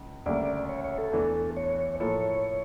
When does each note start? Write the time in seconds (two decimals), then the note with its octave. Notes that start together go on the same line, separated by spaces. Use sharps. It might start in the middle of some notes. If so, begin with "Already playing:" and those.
Already playing: C#2
0.26 D2 C#3 G3 A#3 D5
0.69 C#5
0.84 C#5
0.98 A4
1.13 E2 E3 A3 D4
1.57 C#5
2.00 A2 F3 A#3 E4 A4 C#5